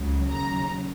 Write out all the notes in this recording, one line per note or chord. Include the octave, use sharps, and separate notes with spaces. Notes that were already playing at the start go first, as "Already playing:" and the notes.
Already playing: C#2 C#3 F#3
D#2 C#3 F#3 A#5